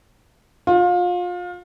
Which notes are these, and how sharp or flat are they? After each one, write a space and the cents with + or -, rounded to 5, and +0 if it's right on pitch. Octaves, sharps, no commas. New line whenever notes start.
F4 +30